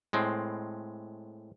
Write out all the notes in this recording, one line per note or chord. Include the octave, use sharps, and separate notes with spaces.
A2 G#3 C4